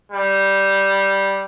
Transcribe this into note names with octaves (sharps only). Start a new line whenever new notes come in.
G3